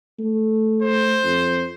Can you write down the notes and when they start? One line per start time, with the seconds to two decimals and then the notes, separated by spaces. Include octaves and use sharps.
0.19 A3
0.82 C5
1.24 F2